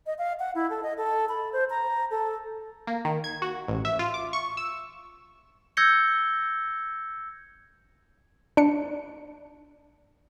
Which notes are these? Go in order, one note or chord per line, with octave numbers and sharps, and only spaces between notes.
D#5
F5
F#5
E4
A4
D#5
A4
B5
C5
A#5
A4
A#3
D#3
G#6
F#4
A1
E5
F4
D6
C#6
E6
E6 G6 G#6 A#6 C#7 G7
D4 C#7